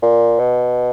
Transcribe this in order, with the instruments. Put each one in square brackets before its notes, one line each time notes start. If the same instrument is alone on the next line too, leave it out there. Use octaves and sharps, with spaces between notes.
[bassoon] A#2
B2